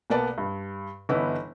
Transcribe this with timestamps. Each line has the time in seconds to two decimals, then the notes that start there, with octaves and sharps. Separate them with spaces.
0.10 B1 A#3 B3 D5 A5
0.38 G2
1.09 G1 E3 B3 D#4 E4